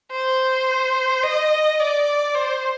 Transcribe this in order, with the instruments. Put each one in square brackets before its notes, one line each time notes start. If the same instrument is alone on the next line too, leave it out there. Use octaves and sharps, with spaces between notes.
[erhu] C5
D#5
D5
C5